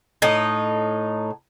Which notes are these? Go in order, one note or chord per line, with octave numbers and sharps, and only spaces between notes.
A2 D#4